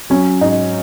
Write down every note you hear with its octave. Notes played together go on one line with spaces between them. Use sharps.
F#3 C#4
G#2 D#4